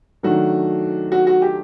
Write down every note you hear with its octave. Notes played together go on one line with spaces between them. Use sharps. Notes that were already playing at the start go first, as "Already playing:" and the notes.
D#3 F#3 A3 D4 F#4
F#4
F#4
G4